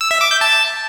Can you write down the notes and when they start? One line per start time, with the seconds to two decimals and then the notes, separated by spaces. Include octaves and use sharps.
0.01 E6
0.11 E5
0.21 D6
0.31 G6
0.41 A5